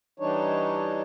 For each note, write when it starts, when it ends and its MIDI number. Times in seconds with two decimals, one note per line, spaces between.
0.20 1.02 52
0.20 1.02 55
0.20 1.02 62
0.20 1.02 63
0.20 1.02 73